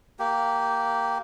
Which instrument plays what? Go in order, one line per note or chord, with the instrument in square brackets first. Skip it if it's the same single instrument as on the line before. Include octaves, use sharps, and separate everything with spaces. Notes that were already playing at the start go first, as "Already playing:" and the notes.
[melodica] A#3 G4